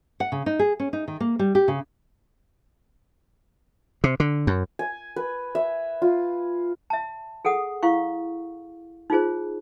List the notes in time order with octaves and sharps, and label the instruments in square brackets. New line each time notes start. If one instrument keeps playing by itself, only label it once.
[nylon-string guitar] F#5
C#3
D#4
G#4
C#4
D#4
D#3
A#3
G3
G4
C#3
[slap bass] C3
D3
F#2
[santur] G#5
B4
E5
F4
[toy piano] E5 A5
G#4 A4 F#5 D#6
E4 F5 C#6
D#4 F4 G#4 C5